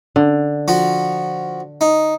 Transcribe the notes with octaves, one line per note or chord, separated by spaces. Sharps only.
D3
F3 F#4
D#4